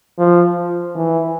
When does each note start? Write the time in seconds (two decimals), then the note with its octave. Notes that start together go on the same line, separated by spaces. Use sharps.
0.19 F3
0.95 E3